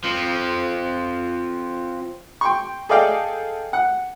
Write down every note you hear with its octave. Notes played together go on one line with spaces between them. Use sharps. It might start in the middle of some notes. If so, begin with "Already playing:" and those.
F3 C4
G5 C6 C#6
G#4 A4 D5 D#5 F5 G5
F#5